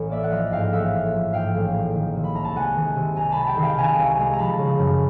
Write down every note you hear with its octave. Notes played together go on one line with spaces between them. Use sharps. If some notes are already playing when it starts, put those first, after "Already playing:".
Already playing: A1
A#3 D5 E5
F#5
F3 D#5 F5
G#2 F5 G5
A1 E5 F#5
A#3
F3
G#2 F5 G5
A1
A#3
D#3
C3
B5
C2 A#5
A5
G#3 F#5 G#5
D#3
C3
C2 G#5 A#5
G#3 A5 B5
G5 A5
D#3
F5 G5
C3 G#5 A#5
C2
G#3
A#5
F3 A5 B5
C#3
F#2